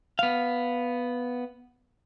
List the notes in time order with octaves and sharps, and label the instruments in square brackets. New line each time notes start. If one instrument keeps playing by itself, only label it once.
[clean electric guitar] B3 F5